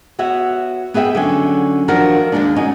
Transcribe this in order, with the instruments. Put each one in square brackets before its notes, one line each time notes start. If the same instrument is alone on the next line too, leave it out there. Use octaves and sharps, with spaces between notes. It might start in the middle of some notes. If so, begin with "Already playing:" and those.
[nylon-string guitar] B3 F#4 C#5 E5
B3 G#4 B4 E5 G5
D3 F#3 C#4
D#3 F3 D4 F#4 A#4
D#2 G#2 G#3 A#3 D4
C#4 D#4 F#4